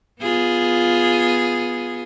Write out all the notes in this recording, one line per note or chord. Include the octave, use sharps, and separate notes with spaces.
B3 F4 G#4